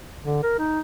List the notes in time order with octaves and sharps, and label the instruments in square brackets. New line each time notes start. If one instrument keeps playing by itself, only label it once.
[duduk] D3
A#4
D#4